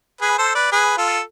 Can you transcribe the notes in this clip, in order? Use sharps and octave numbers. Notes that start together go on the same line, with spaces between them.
G#4 B4
A4 C5
B4 D5
G#4 B4
F4 A4